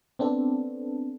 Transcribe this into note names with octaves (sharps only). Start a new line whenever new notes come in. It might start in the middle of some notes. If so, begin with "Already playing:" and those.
B3 C4 D4 A4